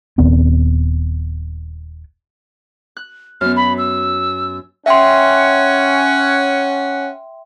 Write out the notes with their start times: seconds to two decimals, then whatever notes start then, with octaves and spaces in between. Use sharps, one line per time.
0.18 D#1 D#2 B3 C4
2.97 F#6
3.41 F#2 B3 F6
3.56 B5
3.78 E6
4.86 C#4 E5 F#5 G5 C6